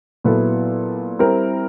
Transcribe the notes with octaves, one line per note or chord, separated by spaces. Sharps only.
A#2 F#3 B3 E4 A4
G3 C4 E4 G4 A#4